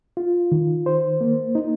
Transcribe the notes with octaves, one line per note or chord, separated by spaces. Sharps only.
F4
D#3
C5
A#3
D#4